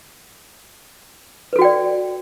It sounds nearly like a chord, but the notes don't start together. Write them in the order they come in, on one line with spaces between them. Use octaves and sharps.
B4 A4 F#4 G5 D5